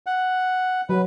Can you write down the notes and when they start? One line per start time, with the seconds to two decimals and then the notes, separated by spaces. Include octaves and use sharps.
0.07 F#5
0.89 F#3 B4